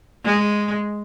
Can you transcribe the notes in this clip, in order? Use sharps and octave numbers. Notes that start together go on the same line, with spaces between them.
G#3